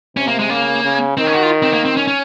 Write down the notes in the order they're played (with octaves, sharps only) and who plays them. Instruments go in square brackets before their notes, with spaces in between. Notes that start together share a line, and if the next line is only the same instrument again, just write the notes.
[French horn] C3 [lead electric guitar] C#4
[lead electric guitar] A#3
G#3
[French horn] C#3 [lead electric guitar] A#3
[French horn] C#3
[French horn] D#3 [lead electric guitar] C4
[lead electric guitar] C#4
F#4
F4
C4
A#3
C4
C#4
C#4